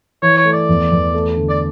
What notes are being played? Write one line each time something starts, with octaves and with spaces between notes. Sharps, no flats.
E3 C#5
C#5
A3
D5
E2
E2
A3
D3
D5